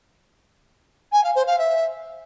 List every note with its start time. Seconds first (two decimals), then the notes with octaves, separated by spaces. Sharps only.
1.12 G#5
1.24 F5
1.35 C5
1.47 F5
1.58 E5